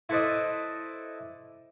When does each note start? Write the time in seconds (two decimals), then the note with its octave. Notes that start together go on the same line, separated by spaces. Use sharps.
0.09 E4 A4 B4 C5 D5 D#5